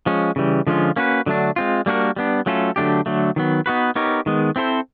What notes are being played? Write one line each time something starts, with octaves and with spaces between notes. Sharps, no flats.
F3 G#3 C#4
C#3 E3 G3
D3 F3 G#3 C#4 F4
A#3 C#4 F#4 B4
D3 F#3 A3 D4
G#3 C4 F4
G3 A#3 D4 F#4 A#4
G3 B3 D4
F#3 A3 C#4 F4 A4
D3 F#3 A3 D4 G4
D3 F#3 A3
D#3 F#3 B3
B3 D#4 F#4 B4
B3 D#4 G4 A#4 C#5
D#3 G#3 B3
C4 E4 A4 C5